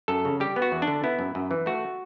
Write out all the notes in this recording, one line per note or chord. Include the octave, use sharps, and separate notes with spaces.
F#2 A4
C#3
G3 G4
B3
F#4
E2
D4
D3
B3 E4
F#2
F#2
E3
A3 F#4